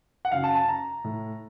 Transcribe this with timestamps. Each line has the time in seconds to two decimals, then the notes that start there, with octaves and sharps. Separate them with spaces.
0.25 F#5
0.32 F#2 C#3 F5
0.44 A5
0.55 A5
0.69 A#5
1.04 A2